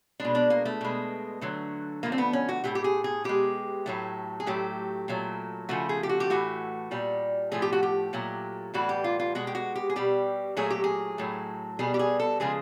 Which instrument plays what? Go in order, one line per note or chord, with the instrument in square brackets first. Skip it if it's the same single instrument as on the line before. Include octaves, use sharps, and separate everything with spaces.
[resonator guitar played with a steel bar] B2 G#3 D4
D4
A#3
A3
B2 G#3
D3 F#3 A3
D3 F3 A3 A#3
C4
B3
C#4
F#4
A2 E3 A3 G4
G4
G#4
G#4
B2 G#3 G4
A2 F#3 A3
G#4
A2 F#3 A3 G4
A#2 F#3 A3
C#3 F3 A3 F#4
G#4
G4
F#4
G4
A2 E3 A3 F#4
A#2 G3
A2 F3 A3 G#4
G4
F#4
G4
A#2 F#3 A3
A2 E3 G3 F#4
G4
F4
F4
B2 G#3 F#4
G4
F#4
G4
G#4
B2 G3 G4
A#2 F#3 A3 G#4
G4
G#4
A2 F#3 A3
B2 G3 G#4
G4
G#4
A4
C#3 F3 G#3 G#4